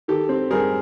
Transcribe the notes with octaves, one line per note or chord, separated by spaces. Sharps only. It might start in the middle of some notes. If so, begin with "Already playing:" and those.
D#3 G4 A4
C4
G3 G#4 A#4